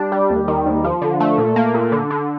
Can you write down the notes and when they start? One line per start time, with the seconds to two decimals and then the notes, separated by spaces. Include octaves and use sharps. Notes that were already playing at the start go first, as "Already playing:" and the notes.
Already playing: G3 D4
0.12 G3
0.30 D#2
0.48 D#3
0.66 D#2
0.84 F3
1.02 D3
1.20 A3
1.38 A#2
1.56 A#3
1.74 A#2
1.92 D3
2.10 D3